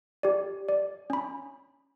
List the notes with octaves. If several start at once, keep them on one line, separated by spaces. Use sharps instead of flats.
G4 D5
D5
C#4 B5